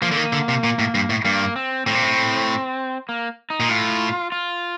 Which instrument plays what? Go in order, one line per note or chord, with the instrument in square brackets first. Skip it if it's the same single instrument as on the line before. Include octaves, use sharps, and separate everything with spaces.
[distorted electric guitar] F3 [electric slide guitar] A#3
[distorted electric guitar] D3
D#3
D3
C3
A#2
A2
G2
A2
[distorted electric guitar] G2 [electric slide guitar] A#3
[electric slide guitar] C4
[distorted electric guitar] A2 [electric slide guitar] C4
[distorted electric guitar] A#2
A2
[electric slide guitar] A#3
D#4
[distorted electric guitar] A#2
[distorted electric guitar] A2 [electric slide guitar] F4
[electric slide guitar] F4